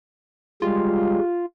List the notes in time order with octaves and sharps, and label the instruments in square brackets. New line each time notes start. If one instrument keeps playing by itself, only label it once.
[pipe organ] G3 G#3 [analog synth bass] F4